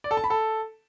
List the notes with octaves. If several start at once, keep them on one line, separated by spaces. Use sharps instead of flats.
D5
A4
A5
B5
A4